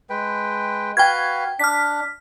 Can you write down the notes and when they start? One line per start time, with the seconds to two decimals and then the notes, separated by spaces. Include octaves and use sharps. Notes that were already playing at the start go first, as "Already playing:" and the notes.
0.10 G#3 B4 G5
0.97 F#4 B4 F5 G5 G#6
1.59 D4 F6 B6